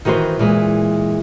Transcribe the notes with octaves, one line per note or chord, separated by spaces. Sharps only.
D#3 E3 F#4 B4 C5
A#2 E3 G#3